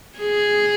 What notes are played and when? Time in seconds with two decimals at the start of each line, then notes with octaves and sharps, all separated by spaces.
0.19 G#4